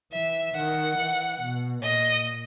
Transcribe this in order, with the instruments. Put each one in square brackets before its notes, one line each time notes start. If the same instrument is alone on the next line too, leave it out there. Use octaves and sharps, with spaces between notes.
[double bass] E3 [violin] E5
[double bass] D#3 [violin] F#5
[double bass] E3
B2
[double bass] A#2 [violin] D#5